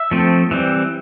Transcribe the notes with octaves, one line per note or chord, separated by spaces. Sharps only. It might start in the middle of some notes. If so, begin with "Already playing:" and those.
Already playing: E5
F3 A3 C4
E3 G3 C4